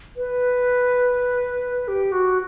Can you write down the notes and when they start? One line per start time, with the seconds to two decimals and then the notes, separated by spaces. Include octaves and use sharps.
0.17 B4
1.88 G4
2.12 F#4